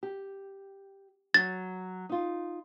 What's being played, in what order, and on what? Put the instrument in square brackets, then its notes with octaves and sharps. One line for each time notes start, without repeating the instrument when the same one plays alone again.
[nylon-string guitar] G4
[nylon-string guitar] F#3 [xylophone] A6
[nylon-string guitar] D#4 F4